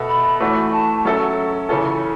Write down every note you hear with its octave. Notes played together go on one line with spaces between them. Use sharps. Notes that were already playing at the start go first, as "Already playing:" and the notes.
Already playing: B2 B3 A4 E5
B5
E3 A3 F#4 C#5
A5
F#3 C#4 A4 E5
C#3 E3 C#4 A4